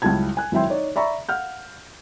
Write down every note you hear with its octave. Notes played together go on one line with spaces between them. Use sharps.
C#2 F#3 G3 E4 A5 G#6
G#5 F#6
G#1 F#3 E4 E5 G5 C6
D#4 C#5 D5
D5 E5 A#5 B5 C#6
F5 F#5 F6 G6